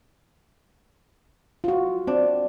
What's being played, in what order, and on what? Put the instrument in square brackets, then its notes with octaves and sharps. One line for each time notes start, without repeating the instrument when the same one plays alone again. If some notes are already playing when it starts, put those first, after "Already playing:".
[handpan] F4 F#4
[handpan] C4 [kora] D4